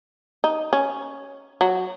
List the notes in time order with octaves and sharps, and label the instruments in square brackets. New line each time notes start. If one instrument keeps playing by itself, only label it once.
[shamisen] D#4
C#4
F#3